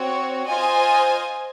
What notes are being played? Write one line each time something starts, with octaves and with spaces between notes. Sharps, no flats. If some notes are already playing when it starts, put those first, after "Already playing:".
Already playing: C4 F#4 C#5
F4 C5 D#5 G#5